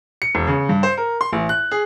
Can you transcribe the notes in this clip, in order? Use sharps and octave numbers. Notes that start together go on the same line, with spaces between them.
C#7
E1
C#3
G2
C5
A#4
C6
A1
F#6
G#4